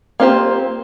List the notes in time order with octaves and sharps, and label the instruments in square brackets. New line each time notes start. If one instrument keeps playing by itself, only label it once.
[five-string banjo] A#3 C4 F4 G4 C5